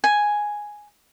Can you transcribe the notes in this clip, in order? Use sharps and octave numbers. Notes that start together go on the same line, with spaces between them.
G#5